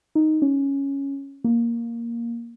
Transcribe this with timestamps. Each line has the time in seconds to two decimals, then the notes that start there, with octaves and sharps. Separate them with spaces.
0.15 D#4
0.42 C#4
1.44 A#3